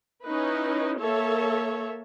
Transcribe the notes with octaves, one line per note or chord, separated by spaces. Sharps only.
C#4 D#4 E4 B4
A#3 A4 C#5 E5